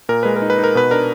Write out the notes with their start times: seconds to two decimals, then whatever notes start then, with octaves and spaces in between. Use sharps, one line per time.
0.09 A#2 A#4
0.23 G#3 B4
0.36 A#4
0.42 D#4
0.50 B4
0.58 D#4
0.64 A#4
0.75 B2 B4
0.91 D4 A#4